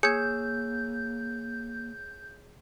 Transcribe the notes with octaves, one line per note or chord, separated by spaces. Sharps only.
A#3 G#4 C#5 E6 G6 G#6 C#7